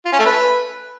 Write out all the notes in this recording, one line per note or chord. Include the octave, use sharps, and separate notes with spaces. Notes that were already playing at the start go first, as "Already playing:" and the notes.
F4
C#4
A3
B4